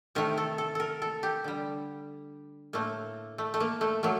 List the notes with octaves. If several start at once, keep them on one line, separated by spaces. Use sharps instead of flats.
C3 D#3 A3 A#4
A4
A4
A4 A#4
A4
G4
D3 G3
A2 A3 A#3
A3
A3
A#3
A3
F#3 A3 A#3